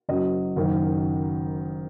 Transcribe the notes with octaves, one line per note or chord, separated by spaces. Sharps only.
F#1 F#2 F#3 D#5
F#1 F#2 D#3 F#3